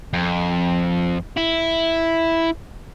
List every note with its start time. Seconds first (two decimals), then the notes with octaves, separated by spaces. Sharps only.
0.13 F2
1.37 E4